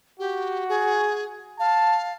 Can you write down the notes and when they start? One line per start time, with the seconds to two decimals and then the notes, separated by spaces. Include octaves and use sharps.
0.20 F#4 G4
0.69 G#4
1.60 F5 A5